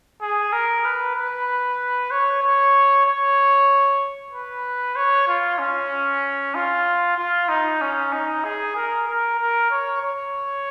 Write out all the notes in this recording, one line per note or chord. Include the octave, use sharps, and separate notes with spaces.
G#4
A#4
B4
B4
C#5
C#5
C#5
B4
C#5
F4
C#4
F4
F4
D#4
C#4
D#4
G#4
A#4
A#4
A#4
C#5
C#5